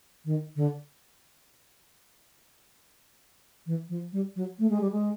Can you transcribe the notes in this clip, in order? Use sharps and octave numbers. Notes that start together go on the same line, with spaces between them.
D#3
D3
E3
F3
G3
F#3
A3
G#3
G3
G#3